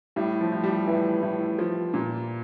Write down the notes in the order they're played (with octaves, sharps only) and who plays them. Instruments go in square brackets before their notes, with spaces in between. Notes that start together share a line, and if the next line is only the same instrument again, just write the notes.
[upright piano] A2 [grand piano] G3
[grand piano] F3
[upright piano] A2
[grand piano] G3
[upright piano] A2 [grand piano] E3
[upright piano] A2
F3
A#2